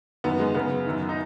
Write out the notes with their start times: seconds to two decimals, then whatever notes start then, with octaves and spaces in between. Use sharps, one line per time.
0.24 F#2 D#3 B3
0.39 G#3
0.55 C#3 B3
0.60 F#2
0.86 F#2 D#3
1.09 D#4